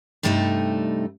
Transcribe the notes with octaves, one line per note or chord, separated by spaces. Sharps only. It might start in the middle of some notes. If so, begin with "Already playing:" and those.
G2 C3 G3 A3 C4 D#4